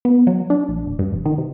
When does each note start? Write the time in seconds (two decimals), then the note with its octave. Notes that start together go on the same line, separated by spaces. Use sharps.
0.05 B3
0.27 F#3
0.50 D4
0.68 A#1
0.86 D#1
0.99 G2
1.12 F1
1.26 D#3
1.38 C3